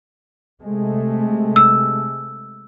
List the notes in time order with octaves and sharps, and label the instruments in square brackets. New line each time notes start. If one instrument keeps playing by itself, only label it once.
[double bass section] C3 G#3 A3
[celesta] E6